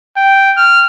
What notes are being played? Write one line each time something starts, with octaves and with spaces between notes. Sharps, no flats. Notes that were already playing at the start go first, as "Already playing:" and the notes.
G5
F6